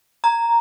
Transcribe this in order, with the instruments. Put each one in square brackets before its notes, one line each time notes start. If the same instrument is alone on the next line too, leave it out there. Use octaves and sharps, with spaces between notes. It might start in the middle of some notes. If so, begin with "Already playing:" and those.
[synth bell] A#5